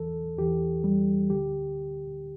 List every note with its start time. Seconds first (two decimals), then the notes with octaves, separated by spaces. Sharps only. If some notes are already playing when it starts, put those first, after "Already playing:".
Already playing: E2 E3 A4
0.37 E2 E3 G4
0.84 G3
1.30 D2 D3 G4